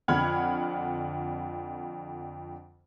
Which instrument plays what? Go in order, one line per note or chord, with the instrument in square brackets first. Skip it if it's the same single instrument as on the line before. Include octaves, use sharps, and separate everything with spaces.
[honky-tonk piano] F2 D3 F#5 B5 F6 G#6